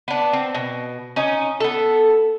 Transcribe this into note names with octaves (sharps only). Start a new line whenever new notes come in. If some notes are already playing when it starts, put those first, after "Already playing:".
B3 D4
C4
B2
C#4 D#4
B3 A4